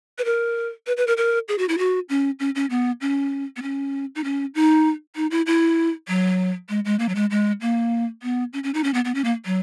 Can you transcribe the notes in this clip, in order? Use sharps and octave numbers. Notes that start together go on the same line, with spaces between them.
B4
A#4
B4
B4
A#4
A#4
G#4
F#4
E4
F#4
C#4
C#4
C#4
B3
C#4
B3
C#4
D#4
C#4
D#4
D#4
E4
E4
F#3
G#3
G#3
A#3
F#3
G#3
G#3
A#3
B3
C#4
C#4
D#4
C#4
B3
B3
C#4
A#3
F#3